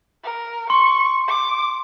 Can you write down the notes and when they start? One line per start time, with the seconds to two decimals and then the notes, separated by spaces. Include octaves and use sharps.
0.24 A#4
0.70 C6 C#6
1.28 D6